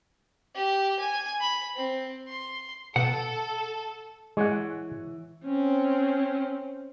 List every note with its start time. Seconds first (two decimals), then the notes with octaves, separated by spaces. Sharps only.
0.55 G4
0.99 G#5
1.40 B5
1.76 C4
2.28 C6
2.96 B2 A4 F#5
4.37 E3 G#3 C#5 F#5
5.45 C4 C#4